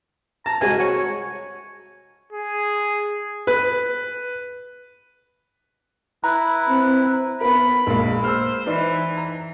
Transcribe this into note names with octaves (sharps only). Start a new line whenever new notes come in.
A5 A#5
C2 G#3 F#4 G#5
F#4 C#5
G#4
B4
E4 B4 A#5
C4
B3 A#4 B5
A#1 G#3 A#3
C5 E6 F6
E3 D#4 B4 D5
A#5